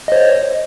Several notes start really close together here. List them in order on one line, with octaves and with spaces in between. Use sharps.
D#5 C5 C#5